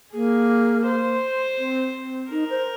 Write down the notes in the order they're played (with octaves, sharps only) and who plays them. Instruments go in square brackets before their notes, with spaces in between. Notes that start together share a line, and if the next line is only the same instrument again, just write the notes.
[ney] A#3 [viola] G#4
[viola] C5
[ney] C4
C4
[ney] D#4 [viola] A#4
[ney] C5